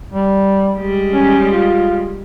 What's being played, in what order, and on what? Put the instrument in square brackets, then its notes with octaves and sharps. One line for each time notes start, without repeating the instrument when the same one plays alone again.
[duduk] G3
[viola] G3 G#3
[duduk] C#4
F4